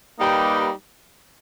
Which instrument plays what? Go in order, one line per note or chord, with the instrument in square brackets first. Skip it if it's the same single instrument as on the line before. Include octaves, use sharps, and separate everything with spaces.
[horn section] G3 A#3 D#4 G4 B4